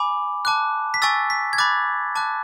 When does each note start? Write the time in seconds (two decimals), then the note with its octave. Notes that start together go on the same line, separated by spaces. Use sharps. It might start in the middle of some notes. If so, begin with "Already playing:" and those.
Already playing: G#5 B5 D6
0.45 A5 D6 F#6
0.94 B6
1.02 G#5 C#6 E6 A6
1.30 B6
1.53 G#6
1.58 B5 D6 F#6 A6
2.15 A5 D6 F#6